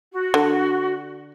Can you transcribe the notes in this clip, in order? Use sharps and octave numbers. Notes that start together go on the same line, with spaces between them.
F#4
D3